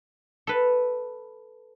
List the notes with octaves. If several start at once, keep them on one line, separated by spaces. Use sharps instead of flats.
A4 B4